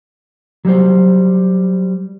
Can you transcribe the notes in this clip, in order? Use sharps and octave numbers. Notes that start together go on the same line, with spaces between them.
F#3 G3 G4 C5